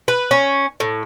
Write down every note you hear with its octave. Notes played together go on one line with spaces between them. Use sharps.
B4
C#4
A2